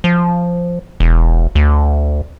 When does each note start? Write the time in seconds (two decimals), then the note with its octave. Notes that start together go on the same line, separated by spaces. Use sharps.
0.04 F3
1.00 E1
1.55 D2